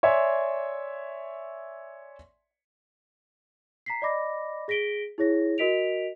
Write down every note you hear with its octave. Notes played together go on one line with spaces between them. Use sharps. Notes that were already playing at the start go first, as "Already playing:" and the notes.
C#5 D5 E5 G#5 C6
A#5 B6 C7
D5 D#5 B5 D6 A#6
G#4 A#6 B6 D7 G7
E4 G#4 C#5 A#6
F#4 A#4 D#5 B6 D7 F7